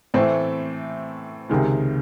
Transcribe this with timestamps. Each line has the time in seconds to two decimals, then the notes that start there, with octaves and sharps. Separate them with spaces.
0.14 A2 E3 A3 C4
1.50 C#2 C3 D#3 G#3